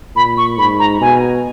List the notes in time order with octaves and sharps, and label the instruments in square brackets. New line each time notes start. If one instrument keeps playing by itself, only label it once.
[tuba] A#2 [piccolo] B5
[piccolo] C#6
[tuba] G#2 [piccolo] B5
[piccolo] A#5
[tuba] B2 [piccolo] G#5